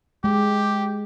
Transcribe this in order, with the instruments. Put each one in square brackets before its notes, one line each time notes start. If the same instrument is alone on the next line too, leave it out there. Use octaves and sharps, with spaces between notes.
[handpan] G#3 [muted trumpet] G4